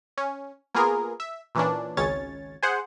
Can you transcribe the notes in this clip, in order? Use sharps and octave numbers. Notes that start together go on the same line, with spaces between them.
C#4
A#3 B3 F4 G#4 A#4
E5
A#2 E3 C#4 D4
G#1 C#2 C#4 C#5 A6
G#4 C5 F#5